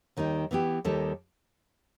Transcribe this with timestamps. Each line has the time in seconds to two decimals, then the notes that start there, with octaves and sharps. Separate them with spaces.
0.17 D#2 D#3 G3 D#4
0.51 E3 B3 E4 G4
0.84 D#2 D#3 G3 D#4 A4